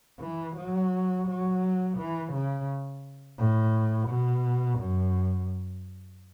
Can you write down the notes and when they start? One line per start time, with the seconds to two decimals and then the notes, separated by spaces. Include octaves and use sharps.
0.21 E3
0.56 F#3
1.28 F#3
1.98 E3
2.33 C#3
3.39 A2
4.09 B2
4.79 F#2